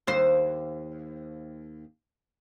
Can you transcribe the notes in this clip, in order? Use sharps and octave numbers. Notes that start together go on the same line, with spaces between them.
D#2 C5